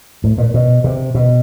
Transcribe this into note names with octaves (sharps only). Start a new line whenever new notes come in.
A2
A#2
B2
C3
B2